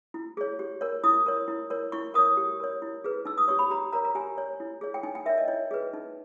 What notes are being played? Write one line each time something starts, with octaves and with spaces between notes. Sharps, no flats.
E4
G#4 C#5
G4
A#4 C#5
E4 D#6
A#4 C#5
E4
A#4 C#5
E4 C#6
A#4 C#5 D#6
G4
A#4 C#5
E4
G#4 B4
D#4 E6
D#6
G4 C#5 C#6
B5
G4 A#5
A#4 C#5 A#5
A#5
G4 G#5
C#5
E4
G#4 C#5
G5
D#4 G#5
G5
A#4 C#5 E5
D#5
E4 C#5
G#4 B4
D#4